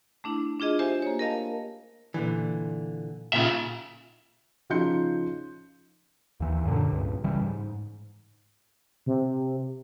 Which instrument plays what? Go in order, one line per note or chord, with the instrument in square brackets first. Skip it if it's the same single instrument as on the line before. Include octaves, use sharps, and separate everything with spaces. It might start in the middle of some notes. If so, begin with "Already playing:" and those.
[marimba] A3 D4 E4
D4 F4 G#4 D#5
G4 C5 E5 G#5
A#3 C#5
A#4 D#5 F5 A5
[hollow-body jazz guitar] A#2 D3 E3
[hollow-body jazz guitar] A#2 C#3 [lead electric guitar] F4 E5
[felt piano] C#3 F3 D#4 C6 G6 C#7
[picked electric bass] D#2 E3
F#2 A#2 D3
C#2 G2
C#3 E3 G3
G#2
[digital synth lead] C3